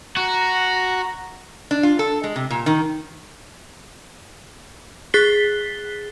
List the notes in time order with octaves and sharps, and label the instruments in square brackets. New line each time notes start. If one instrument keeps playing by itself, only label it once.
[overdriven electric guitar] F#4 [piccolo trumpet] A#5
[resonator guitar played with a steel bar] D4
F4
A4
G#3
C3
A#2
D#3
[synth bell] G#4 F#6 A6 B6 C7 G7